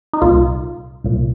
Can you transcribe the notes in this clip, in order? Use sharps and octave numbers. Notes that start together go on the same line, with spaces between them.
D#4
C2 A#2 F4
C2 A#2